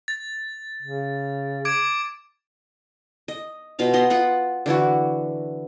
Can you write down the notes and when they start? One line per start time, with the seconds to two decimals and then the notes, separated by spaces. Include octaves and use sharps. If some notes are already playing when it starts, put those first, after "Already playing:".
0.08 A6
0.82 C#3
1.65 D6 G#6 D7
3.28 D#5
3.79 B2 F4 F5 A#5
3.93 B3 D#5 C6
4.10 F4 F#5 B5
4.66 D3 E3 E4 F#4